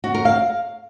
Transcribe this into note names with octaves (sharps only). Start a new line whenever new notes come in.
F#4
A#4
F5